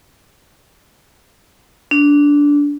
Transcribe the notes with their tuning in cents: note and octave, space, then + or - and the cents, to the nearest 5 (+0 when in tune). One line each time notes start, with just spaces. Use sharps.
D4 -15